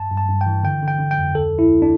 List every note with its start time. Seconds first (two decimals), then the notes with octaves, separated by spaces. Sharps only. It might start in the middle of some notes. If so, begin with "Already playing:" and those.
Already playing: G2 A5
0.11 G2
0.17 A5
0.28 G2
0.41 G5
0.46 E3
0.63 D3 G5
0.82 D3
0.88 G5
0.99 D3
1.11 G5
1.18 F2
1.35 D2 A4
1.53 D2
1.59 E4
1.70 D2
1.82 D4